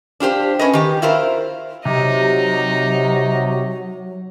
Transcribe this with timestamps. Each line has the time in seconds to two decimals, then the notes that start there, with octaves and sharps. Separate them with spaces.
0.20 D4 F4 G4 C5
0.59 C#4 B4 D#5
0.73 D#3 G4
1.02 E4 F4 A#4 C5
1.85 C3 F#3 D#4